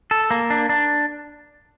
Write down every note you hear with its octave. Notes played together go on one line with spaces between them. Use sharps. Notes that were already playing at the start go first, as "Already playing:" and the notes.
A4
A#3
D4
D4